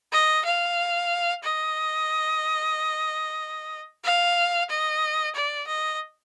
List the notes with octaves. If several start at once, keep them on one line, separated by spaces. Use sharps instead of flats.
D#5
F5
D#5
F5
D#5
D5
D#5